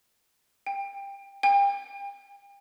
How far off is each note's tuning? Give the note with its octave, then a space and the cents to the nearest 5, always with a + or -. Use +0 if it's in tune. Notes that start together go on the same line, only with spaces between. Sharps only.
G5 +20
G5 +35